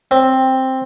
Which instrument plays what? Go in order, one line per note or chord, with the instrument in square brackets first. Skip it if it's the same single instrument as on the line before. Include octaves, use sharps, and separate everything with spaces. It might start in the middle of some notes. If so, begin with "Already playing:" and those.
[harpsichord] C4